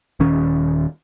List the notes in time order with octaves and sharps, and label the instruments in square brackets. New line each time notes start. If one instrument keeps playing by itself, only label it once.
[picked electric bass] D#1 D#3 C#4